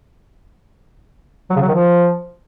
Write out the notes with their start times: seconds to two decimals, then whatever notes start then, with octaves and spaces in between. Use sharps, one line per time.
1.50 F#3
1.56 C#3
1.62 F#3
1.68 D#3
1.74 F3